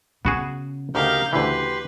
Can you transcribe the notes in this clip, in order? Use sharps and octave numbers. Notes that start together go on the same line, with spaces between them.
C#3 B3 F#4 G#4
D2 D#4 G4 A#4 F5 G6
D2 E3 G4 B4 C6